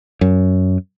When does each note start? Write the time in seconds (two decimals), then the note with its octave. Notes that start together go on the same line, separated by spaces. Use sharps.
0.21 F#2